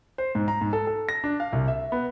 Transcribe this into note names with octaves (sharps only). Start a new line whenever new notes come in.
C5
G#2
A#5
G#2
A4
A4
A#6
D4
F5
C2
E5
B3